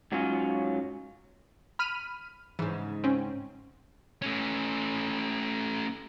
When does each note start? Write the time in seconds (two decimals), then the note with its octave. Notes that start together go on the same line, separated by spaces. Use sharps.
0.12 G#2 F#3 C#4 F4
1.79 B5 F6 D#7
2.59 G#2 C#3 E3
3.04 C4 C#4
4.22 A3 C#4